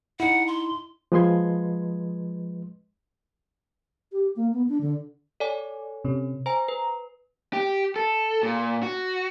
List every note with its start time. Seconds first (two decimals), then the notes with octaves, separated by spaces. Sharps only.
0.20 D#4 E4 F#5
0.47 C6
1.12 F3 G#3 B4 D#5 C6 G#6
4.12 G4
4.36 A#3
4.53 B3
4.69 D4
4.81 D3
5.40 A4 C#5 D5 G#5
6.05 C3 C#4
6.46 C5 G#5 A#5
6.68 B4
7.53 G4
7.96 A4
8.43 A#2
8.83 F#4